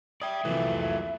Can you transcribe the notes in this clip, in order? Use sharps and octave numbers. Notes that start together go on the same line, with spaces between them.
D5 E5 G5 D#6 G#6
C2 F2 A#2 E3 F#3 A3